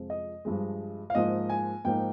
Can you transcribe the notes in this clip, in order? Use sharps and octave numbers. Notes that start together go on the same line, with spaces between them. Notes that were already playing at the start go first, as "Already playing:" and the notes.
Already playing: F2 C3 F3 G#3
D#5
G2 F3 G#3
F5
G#2 F3 A#3 F4 D#5
G#5
G#2 F3 A#3 D#4 G5